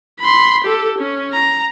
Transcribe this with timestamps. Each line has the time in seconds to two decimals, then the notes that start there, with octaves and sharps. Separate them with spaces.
0.20 B5 C6
0.64 G4 A4
0.98 C#4
1.33 A#5